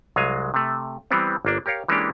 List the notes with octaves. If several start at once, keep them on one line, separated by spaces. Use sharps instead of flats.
C2 F#3 G#3 F5 G#5
C3 A3
E3 G3 B3 C4
G1 A#3 D4
G4 A#4 C#5 F5
E3 G#3 A#3 C#4 D4 G4